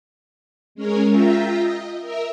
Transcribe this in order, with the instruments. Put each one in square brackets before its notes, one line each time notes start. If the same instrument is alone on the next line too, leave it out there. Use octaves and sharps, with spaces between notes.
[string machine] G#3 C#4 A#4 C#5
F4 E5 G5 A#5
D#5
A#4 E5